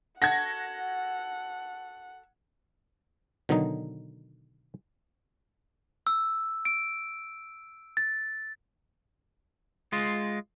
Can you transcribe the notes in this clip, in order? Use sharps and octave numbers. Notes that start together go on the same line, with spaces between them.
F#4 A4 F#5 G#6 A#6
B2 D3 D#3 F#3 D#4
E6
D7
A6
G#3 F4